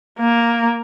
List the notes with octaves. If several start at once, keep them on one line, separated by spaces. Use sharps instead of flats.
A#3